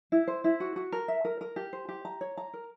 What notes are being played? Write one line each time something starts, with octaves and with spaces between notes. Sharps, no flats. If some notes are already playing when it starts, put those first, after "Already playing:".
E4
C5
E4
F#4
F#4
A#4
E5
A#4
A#4
G4
C5
G4
A#5
C#5
A#5
A#4